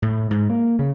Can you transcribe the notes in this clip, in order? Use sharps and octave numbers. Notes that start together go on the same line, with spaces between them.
A2
G#2
A#3
C#3